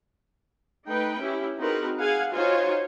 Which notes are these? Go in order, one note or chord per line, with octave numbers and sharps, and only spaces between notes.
A3 D#4 B4 G5
C#4 E4 G4
C4 D#4 F#4 G#4 A#4 B4
G#4 F5 F#5 G#5
D#4 F4 F#4 C5 C#5 G#5